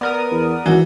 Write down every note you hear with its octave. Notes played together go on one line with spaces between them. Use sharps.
B3 A#4 D5 D#6
E2
G#1 E3 F#4